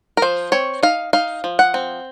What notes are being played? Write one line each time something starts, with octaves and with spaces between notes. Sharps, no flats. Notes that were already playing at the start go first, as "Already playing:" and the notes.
A#4
F3 C5
C4 C#5
D#4 F5
D#4 F5
F3
F#5
C4